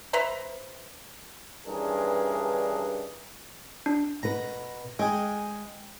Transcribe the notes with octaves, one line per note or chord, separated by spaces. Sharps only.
B4 C5 E5 A#5
G2 E3 C#4 D4 G#4 A#4
D4
B2 B4 A#5
G#3 G#4 G5